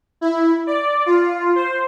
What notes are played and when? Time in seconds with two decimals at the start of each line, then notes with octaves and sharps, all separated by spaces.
0.21 E4
0.67 D5
1.06 F4
1.56 C5